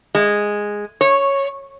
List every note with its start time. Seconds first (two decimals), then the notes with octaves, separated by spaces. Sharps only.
0.15 G#3
1.01 C#5